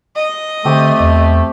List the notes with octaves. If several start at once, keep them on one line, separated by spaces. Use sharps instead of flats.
D#5
D3 A3 C4 G4 D6
E2